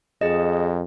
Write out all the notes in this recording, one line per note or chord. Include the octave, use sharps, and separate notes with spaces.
F2 G#4 D#5